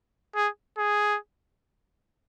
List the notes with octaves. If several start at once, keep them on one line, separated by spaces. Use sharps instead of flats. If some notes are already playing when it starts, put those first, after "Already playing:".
G#4
G#4